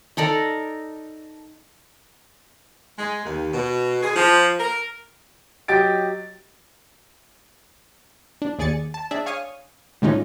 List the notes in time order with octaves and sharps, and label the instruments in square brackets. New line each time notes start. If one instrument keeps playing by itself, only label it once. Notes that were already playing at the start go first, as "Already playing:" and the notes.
[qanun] D#4 A4 A#4 D5
[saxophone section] G#3
D#2
B2
G#4
F3
A#4
[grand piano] F#3 G4 D#5 A6 D7
[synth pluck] D4
D#2 G#4 D5 G#5 A6 C#7
A5
D4 G#4 D5 E5
C#5 F5 G#5 C#6 D#6
A2 D3 G#3 C#4 D#4 F4